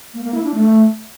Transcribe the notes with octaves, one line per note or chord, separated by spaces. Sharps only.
A#3
A#3
E4
D4
A3